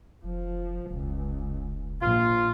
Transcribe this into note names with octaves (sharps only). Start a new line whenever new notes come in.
F1 F3
E1 C#2
A#1 F4